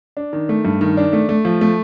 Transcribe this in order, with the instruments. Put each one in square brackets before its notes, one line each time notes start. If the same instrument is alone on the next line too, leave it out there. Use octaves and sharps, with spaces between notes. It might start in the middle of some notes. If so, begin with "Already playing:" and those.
[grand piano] D4
D#3
A3
G2
D#3
D4
A3
A3
F3
A3